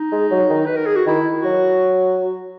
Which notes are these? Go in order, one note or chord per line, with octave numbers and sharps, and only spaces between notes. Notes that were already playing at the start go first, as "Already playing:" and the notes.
Already playing: D#4
G#3
F#3
D#3
B4
A#4
G#4
F#4
D#3 E4
F#4
F#3
F#4